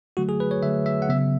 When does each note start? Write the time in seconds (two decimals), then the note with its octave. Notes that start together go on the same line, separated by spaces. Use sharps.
0.17 D3 F#3 A3 F#4
0.29 G#4
0.40 B4
0.51 C#5
0.63 D3 F#3 A3 E5
0.86 E5
1.02 F#5
1.09 C#3 F#3 B3 E5